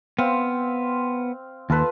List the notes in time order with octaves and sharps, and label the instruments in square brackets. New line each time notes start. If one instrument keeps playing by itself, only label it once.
[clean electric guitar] B3 [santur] C4 F5
[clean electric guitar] D#2 [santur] F4 A4 B4